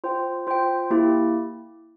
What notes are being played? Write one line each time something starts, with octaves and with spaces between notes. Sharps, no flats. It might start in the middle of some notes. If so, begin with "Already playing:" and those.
F4 C5 G5
F4 C5 G5
A#3 E4 G4